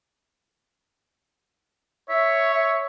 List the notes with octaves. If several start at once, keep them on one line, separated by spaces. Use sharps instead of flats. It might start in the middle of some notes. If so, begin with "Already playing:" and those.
C#5 E5
E5